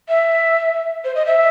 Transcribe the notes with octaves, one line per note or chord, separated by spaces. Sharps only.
E5
C5
D#5
E5